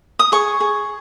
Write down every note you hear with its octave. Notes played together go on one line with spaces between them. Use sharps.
D#6
G#4 C#6
G#4